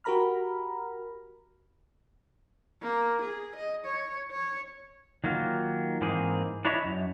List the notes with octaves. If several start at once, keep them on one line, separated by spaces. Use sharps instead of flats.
F#4 G4 A#4 A#5 B5 F6
A#3
G#4
D#5
C#5
C#5
D#3 F#3 A#3 F4
G#2 E3 A#3 C4 G#4
D4 E4 C#5 D#5 E5
F#2